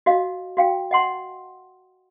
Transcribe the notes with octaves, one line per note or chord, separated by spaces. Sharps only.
F#4 D#5 F5
F#4 F5 G5
D#5 F#5 C6